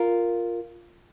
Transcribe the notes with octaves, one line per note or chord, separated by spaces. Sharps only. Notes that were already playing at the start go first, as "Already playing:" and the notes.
Already playing: F4 A#4